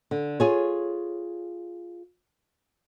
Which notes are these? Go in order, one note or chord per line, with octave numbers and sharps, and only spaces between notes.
D3
F4 G#4 C#5